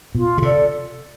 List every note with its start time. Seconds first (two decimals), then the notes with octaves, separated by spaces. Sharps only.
0.15 B2 F4
0.38 C#3
0.42 C3 A4 D5